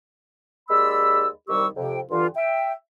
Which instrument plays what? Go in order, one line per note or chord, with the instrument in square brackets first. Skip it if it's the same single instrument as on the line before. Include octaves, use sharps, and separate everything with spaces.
[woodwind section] D#2 G#3 D5 B5 E6
C2 D#3 G3 G4 C#6 E6
F2 C3 G5
G2 D3 E3 F4
E5 G5